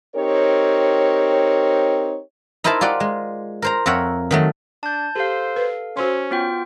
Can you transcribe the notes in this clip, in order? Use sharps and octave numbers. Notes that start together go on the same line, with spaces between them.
C4 D#4 G4 A#4 C#5
D#4 E4 A#4 C5 E5 A5
F4 G4 D5 F#5
G#3
A#4 C5 A#5
F2 A#4 C#5 E5 F#5
D#3 F#3 A3
D4 A5 G6
G4 A4 C5 F5
B4
C#4 F#4 C5 C6
B3 F4 G5